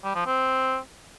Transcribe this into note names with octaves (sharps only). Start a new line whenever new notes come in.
G3
F3
C4